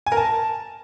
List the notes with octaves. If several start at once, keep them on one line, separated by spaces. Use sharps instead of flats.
G#5
A#4
A5